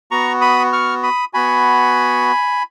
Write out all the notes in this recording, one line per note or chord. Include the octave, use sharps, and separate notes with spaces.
B3 F#4 A#5 C#6
B5 D#6
C#6 F6
B5 D#6
B3 F#4 G#5 B5